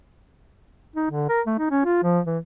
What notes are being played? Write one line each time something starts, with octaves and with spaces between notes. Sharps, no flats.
D#4
D3
A#4
A3
D#4
C#4
F4
F3
E3